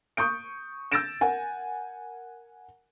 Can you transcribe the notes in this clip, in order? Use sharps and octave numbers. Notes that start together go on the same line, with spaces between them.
C#6 D#6 G6 D7
E6 G6 A6 A#6 D7 E7
A#4 F#5 G#5